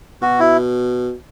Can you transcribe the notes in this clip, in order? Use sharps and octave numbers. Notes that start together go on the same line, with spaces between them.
B2 F#4
E4